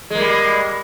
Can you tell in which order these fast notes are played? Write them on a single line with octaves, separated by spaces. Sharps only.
G#3 A#3 G3